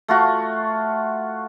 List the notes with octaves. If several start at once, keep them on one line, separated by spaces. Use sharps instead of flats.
A3 F4 F#4